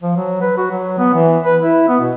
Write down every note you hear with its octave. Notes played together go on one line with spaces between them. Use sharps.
F3
F#3
B4
F#4
F#3
B3
E3
B4
E4
B3
B2